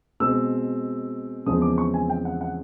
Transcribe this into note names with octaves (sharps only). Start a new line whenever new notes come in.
B2 G#3 C4 E6
E2 C#3 F3 G#3 C4 D#6
D6
C#6
G#5
G5
F#5
F#5